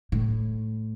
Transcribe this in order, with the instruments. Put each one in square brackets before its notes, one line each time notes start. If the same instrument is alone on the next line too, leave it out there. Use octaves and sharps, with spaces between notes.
[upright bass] A2